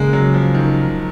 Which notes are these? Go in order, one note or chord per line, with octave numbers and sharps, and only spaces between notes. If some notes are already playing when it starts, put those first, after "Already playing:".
Already playing: C#3 G#3 A#3
F#3
F3
D#3